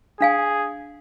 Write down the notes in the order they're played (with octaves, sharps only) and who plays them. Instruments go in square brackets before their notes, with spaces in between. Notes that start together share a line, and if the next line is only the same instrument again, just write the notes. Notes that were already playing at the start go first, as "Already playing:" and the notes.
[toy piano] D4 F5 G#5 [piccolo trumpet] G#4